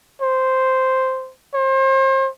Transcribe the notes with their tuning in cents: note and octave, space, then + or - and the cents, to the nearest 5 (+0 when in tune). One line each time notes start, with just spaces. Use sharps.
C5 -5
C5 +35